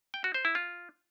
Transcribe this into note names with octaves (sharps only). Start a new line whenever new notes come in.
G5
F#4
C5
E4
F4